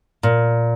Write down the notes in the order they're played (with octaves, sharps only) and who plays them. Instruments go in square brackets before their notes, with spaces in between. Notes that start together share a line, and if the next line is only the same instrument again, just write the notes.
[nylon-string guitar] A#2